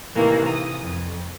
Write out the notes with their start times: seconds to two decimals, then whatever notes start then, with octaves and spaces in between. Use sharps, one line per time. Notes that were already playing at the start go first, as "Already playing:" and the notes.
0.14 A2 C3 D#3 E3 A#3
0.48 D#6
0.81 F2